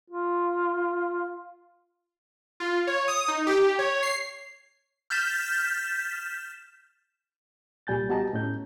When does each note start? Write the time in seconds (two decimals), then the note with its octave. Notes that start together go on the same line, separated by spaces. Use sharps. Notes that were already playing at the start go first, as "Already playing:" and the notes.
0.10 F4
2.60 F4
2.87 C#5
3.08 D#6
3.28 D#4
3.47 G4
3.79 C#5
4.03 C7
5.10 F6 G6 A6 B6 E7
7.87 C2 A#2 G3 G#5 G6 A6
8.09 B3 F#4 G4 D#5 A5 A#5
8.33 A2 C#4 G6